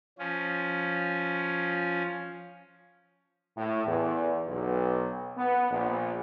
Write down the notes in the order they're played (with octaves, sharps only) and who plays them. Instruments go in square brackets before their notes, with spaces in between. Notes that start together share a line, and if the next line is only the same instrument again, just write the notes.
[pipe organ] F3 C#4
[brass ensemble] A2
E2
B1
B3
A#1